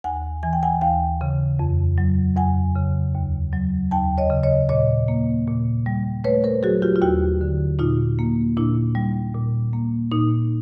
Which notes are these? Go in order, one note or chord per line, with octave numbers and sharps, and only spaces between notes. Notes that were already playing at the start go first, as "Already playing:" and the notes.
D#2 F#5 G#5
E3 G#5
G5
F#5 G#5
D#2 F5 G5
C#3
F2
F#3
F2 F#5 G#5
C#3
D#2
F#3
D#2 G5 A5
C#5 D#5
C#3
C#5 D#5
A#2 C#5 D#5
A#3
A#2
G3
A3 B4 C#5
A#4 C5
F#3 F#4 G#4
F4 G4
F4
D#2 E4 F#4
D3
A#2 D#4 F4
A#3
A#2 D4 E4
G3
A#2
A#3
A#2 D#4